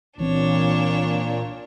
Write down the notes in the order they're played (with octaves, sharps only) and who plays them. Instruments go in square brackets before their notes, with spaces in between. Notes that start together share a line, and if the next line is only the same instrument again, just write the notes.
[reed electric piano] C2 E3 C4 [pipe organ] A#2 [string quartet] D4 C#5